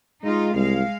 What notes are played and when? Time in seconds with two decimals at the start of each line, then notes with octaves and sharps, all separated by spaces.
0.23 G#3 D#4 F4
0.54 C2 G#3 F5